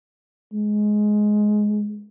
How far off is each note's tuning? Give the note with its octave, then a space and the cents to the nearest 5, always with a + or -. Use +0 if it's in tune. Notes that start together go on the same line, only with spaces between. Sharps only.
G#3 +10